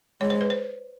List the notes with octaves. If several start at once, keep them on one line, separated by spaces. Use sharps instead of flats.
G#3 C#5
C5
B4
C5